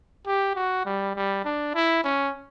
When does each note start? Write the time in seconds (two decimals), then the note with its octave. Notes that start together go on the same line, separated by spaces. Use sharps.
0.27 G4
0.56 F#4
0.86 G3
1.16 G3
1.45 D4
1.75 E4
2.04 C#4